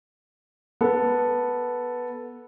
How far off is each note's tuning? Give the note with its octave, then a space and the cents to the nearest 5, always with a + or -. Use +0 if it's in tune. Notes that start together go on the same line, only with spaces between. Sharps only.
B3 -10 A4 +0